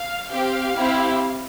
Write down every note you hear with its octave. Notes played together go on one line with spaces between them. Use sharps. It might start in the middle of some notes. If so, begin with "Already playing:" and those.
Already playing: F5
C4 G4 F5
C4 E4 G4